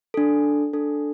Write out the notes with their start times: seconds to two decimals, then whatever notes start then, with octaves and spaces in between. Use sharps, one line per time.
0.14 D4 A4
0.73 D4 A4